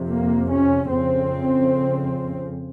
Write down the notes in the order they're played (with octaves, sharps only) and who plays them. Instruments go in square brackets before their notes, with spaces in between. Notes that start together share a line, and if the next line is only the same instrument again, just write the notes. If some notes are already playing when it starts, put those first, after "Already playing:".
Already playing: [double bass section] F2 C3
A#3
C#4
F2 C#3 C4